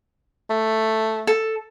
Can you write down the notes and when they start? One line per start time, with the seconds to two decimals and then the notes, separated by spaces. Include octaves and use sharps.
0.50 A3
1.27 A4